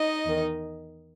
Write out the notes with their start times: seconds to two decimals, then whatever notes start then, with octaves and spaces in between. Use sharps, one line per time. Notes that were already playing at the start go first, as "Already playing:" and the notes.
Already playing: D#4 D#5
0.25 E2 D#3